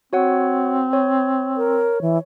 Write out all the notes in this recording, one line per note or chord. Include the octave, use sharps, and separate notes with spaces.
C4 F#4 C#5 F#5
C#5
A#4
E3